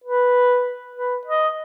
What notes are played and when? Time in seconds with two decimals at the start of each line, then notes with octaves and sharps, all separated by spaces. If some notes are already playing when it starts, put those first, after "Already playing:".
0.04 B4
0.96 B4
1.27 D#5